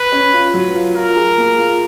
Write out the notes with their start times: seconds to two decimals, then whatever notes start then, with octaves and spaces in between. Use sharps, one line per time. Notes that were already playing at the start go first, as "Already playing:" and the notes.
Already playing: B4
0.12 C#4
0.33 F4
0.54 F#3
0.75 F4
0.95 F4 A#4
1.16 G#4
1.38 A#3
1.59 F4